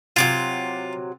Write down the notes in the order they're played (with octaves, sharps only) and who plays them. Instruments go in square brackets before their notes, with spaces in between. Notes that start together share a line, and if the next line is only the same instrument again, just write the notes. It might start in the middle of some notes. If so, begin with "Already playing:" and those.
[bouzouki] C3 F3 F#3 [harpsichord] F4 D6